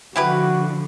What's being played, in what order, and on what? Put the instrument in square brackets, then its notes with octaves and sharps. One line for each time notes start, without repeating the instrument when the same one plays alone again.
[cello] D3 F3 [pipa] E4 G4 B4 [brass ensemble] F#4